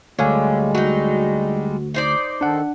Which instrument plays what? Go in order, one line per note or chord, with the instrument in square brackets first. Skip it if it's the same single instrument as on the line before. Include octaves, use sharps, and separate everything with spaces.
[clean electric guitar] D2 [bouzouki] D3 [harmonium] G3 G#3 [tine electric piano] C#5 F5 G#5
[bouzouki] F#3 D#4 [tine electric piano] F#4
[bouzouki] D#4 C5 D5
[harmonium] D#3 A4 [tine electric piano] D4 F#5